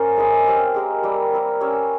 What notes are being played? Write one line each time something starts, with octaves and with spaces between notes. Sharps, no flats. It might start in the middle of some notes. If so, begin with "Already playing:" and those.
Already playing: A#3 C#4 A#4 C5
G#3 E4 G#4 E5
C4 G4 C5 F5
G#3 C4 G4 A#4
G3 A#3 E4 G4
C4 E4 A#4
C#4 G4 C#5 E5